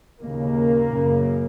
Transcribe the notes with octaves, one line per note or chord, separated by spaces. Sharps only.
D#2 C#3 A#3
F#2 C#3